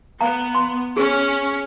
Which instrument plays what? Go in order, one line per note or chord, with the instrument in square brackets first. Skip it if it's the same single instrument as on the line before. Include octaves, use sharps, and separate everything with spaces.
[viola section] B3 [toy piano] F5 A#5
[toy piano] C6
[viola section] C#4 [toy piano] G#4